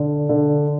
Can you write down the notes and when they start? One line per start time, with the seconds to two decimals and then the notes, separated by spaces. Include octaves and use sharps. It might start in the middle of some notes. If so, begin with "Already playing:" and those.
Already playing: D3
0.29 D3